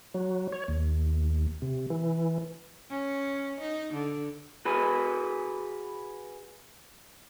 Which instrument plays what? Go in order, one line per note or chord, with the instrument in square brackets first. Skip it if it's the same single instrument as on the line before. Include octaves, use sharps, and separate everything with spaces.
[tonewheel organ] F#3
C#5
D#2
C3
E3
[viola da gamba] C#4
D#4
D3
[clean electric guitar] F#4 G#4 B4